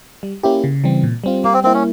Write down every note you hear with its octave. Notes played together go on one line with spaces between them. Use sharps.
G3
A#3 C#4 E4 G4
C#3
E3 G3 C4
A#2
G3 C4 F4
G3 A#3
C4
A#3 C4 E4
C#4